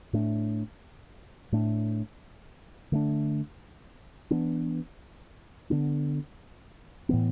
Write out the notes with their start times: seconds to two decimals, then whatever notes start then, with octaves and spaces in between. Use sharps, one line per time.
0.13 A2 A3 D4
1.52 A2 A3 D4
2.92 D3 A3 D4
4.31 E3 B3 D4
5.70 D3 B3 D4
7.09 A2 E3 B3